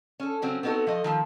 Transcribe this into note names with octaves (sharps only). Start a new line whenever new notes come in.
C#4 A4
C#3 F#3 C4 C#4
B3 C4 D#4 F#4 A4
F3 A3 D#5
D#3 F3 A3